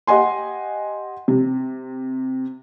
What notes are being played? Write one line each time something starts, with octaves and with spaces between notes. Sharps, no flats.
G4 D#5 F#5 G#5 C6
C3